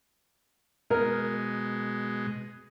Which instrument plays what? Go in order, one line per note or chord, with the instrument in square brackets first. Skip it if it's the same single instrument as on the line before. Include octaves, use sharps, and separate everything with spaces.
[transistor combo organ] B2 G#3 [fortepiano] A#4